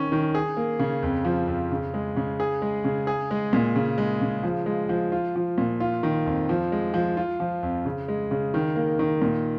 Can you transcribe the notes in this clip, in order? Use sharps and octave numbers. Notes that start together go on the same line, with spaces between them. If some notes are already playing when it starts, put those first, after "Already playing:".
Already playing: D#3 C#4
D#3
G#4
A#3
C#3
F2
F3
F2
C#3
G#3
C#3
G#4
G#3
C#3
G#4
G#3
A#2
C#3
G#3
C#3
F3
G#3
F3
F4
F3
A#2
F4
D#3
F2
F3
G#3
F3
F4
F3
F2
C#3
G#3
C#3
D#3
A#3
D#3
A#2